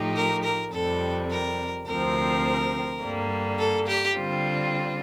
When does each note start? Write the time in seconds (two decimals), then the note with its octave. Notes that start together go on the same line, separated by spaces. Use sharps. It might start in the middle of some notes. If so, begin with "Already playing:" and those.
Already playing: A2 F3 A3 D#4 G4
0.16 A#4
0.44 A#4
0.72 F2 C3 G3 A4
1.30 A#4
1.86 D2 C3 F3 C4 A#4
3.02 G2 D3 G3 A#3
3.59 A4
3.87 G4
4.16 D3 G3 C4 F4